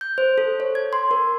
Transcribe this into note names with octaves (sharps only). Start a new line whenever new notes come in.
G6
C5
A4
C#5
G#6
C6
A#4